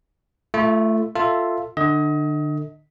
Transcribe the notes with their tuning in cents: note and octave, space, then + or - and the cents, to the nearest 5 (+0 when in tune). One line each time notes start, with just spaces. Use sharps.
A3 +0 F4 -40
F4 +0 A4 +15 E5 +0
D3 +30 D#5 +30